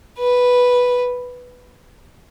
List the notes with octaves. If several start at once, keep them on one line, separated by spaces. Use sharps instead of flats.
B4